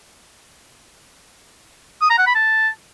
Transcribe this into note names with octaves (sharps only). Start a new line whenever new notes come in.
D#6
A#5
F#5
B5
A5